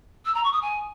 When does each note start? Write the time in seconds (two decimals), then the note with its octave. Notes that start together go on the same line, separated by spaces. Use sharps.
0.25 E6
0.34 A#5
0.43 C#6
0.52 D#6
0.62 G#5